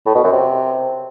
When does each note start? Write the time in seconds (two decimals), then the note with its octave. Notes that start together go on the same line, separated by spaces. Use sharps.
0.06 A2
0.15 B2
0.24 F#2
0.33 C3